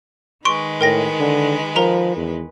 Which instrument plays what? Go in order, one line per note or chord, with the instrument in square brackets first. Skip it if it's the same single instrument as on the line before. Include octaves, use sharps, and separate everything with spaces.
[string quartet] D#3 G#3 B4 [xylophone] C6 C#6 D7
[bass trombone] A2 [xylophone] A#4 G5 A#6
[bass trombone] D3
[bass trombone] F3 [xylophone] A#4 A#5 F7
[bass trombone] E2